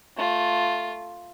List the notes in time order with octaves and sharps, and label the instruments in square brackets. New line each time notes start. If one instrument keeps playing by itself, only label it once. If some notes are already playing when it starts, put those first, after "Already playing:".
[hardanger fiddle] A3 F4